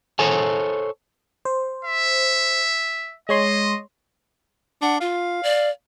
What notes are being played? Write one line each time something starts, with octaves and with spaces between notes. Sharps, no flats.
A4 C5 C#5 G#5
C5
E5
G#3 C#5 D#5 C6
D4 F#5
F4 F5
D5